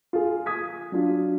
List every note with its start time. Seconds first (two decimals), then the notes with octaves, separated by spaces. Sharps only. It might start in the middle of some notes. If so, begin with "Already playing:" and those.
0.13 F4 G#4
0.46 D#6 G#6 B6
0.92 F#3 D4 F4